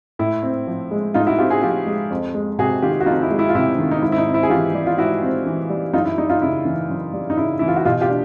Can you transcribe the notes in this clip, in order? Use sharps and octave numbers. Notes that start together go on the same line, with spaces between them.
A2 E4
C4
F3
G#3
A2 D#4 F4
E4 F#4
C4 F4 G4
F#4 G#4
F3 F4 G4
G#3
F2
G#3
C3 F#4 G#4
D#3 F4 G4
F#4
F2 D#4 F4
E4
G#3
E4
F4
C3 E4
D#3
D#4
G#2 E4
E4
D#4
C4
E4
G#4
E3 F4 G4
G3
F4
G#2 E4 F#4
C4
E3
G3
F#2 D#4 F4
E4
G3 D#4
D#4 F4
C#3 E4
E3
F#2
G3
D#4
C#3 E4
E3 E4
F4
F#4
B2 F4 G4
F4 G4
D4